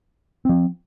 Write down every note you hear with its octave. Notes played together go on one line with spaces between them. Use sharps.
F3 C4